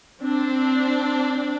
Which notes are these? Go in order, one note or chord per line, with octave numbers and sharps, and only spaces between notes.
C4 D4